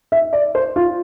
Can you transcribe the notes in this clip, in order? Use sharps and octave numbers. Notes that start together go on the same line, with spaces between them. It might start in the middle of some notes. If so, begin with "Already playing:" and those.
E5
D5
C5
F4